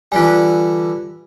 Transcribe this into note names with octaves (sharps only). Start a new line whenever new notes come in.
D3 E3 G3 F4 G#5